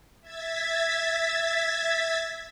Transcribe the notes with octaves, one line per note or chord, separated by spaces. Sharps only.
E5 G#6 A6 B6